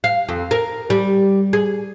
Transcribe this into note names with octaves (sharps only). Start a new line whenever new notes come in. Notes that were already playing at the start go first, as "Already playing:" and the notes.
F5
F2
A#4
G3
G#4